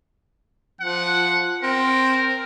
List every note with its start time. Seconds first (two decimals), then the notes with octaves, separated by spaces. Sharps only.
0.81 F3 F#5
1.62 C4 A#4